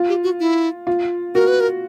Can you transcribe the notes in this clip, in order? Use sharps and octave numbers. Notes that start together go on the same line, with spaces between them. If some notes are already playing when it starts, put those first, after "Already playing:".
Already playing: F4
G4
F#4
E4
F4
F#4 A#4
B4
A#4